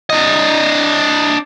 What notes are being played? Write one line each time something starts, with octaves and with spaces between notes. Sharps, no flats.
D4 D#5